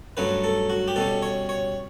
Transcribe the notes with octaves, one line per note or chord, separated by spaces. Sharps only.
G2 F#3 A3 C#4 B4
A4
F#4
G4
B2 G3 C#4 A4
C#5
C#5